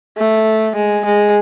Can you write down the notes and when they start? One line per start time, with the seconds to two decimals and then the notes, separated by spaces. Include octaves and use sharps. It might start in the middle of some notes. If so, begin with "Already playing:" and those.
0.18 A3
0.76 G#3
1.05 G#3